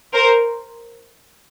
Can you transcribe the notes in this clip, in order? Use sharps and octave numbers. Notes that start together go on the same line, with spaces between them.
A#4 C5